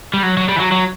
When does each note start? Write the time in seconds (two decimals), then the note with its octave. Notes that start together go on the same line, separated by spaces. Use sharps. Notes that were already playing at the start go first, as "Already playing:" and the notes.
0.13 G3
0.23 F#3
0.37 F#3
0.49 G3
0.56 E3
0.60 F#3
0.72 F#3